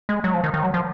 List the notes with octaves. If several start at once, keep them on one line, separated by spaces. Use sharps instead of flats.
G#3
F#3
F3
D#3
D#3
F#3
F3